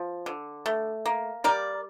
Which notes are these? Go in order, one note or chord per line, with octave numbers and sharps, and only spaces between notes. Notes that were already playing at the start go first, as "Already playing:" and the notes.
Already playing: F3
D3
A3
A#3
G3 A#4 D5